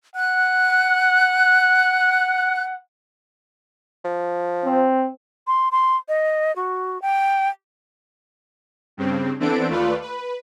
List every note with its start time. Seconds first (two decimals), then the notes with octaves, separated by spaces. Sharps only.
0.16 F#5 F#6
4.05 F3
4.65 C4
5.47 C6
5.72 C6
6.09 D#5
6.56 F#4
7.02 G5
8.97 G2 C#3 C4
9.40 E3 B3 C4 D4 A4 D7
9.68 D#2 A3 F4 B4 D5
10.02 B4